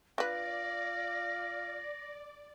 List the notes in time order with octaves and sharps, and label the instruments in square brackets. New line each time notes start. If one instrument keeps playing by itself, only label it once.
[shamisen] D4 B4 [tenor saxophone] F4 [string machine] D5 [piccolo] A#6